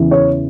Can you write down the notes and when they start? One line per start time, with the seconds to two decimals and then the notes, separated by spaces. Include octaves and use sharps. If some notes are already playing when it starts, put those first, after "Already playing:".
Already playing: E2 C#3 E3
0.11 C#5